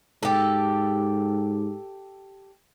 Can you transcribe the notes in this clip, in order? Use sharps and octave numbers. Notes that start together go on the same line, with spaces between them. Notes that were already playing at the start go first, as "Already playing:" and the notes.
G#2 G4 A4